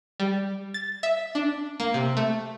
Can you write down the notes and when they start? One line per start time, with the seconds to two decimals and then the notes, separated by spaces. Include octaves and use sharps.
0.20 G3
0.74 A6
1.03 E5
1.35 D4
1.80 A#3
1.94 C3
2.17 A3